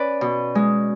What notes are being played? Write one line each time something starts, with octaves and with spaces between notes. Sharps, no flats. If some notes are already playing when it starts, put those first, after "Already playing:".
Already playing: C#4 B4 D5
B2
G#3